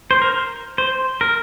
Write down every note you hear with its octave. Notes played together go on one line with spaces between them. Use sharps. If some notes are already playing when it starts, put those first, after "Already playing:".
C5
A#4
C5
A#4